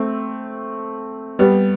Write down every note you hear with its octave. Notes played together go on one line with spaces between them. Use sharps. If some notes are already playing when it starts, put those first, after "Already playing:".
Already playing: A3 C4
G3 B3